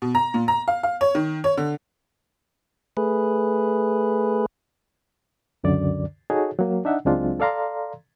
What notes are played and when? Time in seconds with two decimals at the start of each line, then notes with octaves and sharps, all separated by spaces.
0.02 B2
0.15 A#5
0.34 A#2
0.48 A#5
0.68 F5
0.83 F5
1.01 C#5
1.15 D#3
1.44 C#5
1.57 D3
2.97 A3 G#4 B4
5.64 C#2 F#2 D3 D5
6.30 D#4 F#4 G#4 A4 C#5
6.59 F#3 A#3
6.85 D4 D#4 E5 F#5
7.05 C#2 F#3 G#3 C4 D4 F4
7.40 A4 D5 F5 A#5 C6